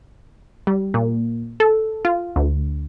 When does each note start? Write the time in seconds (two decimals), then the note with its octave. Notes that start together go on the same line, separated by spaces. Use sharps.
0.67 G3
0.94 A#2
1.60 A4
2.05 F4
2.36 D2